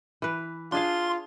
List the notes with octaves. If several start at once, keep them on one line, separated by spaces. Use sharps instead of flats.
E3 B4
D4 F4 G#4 F5 C6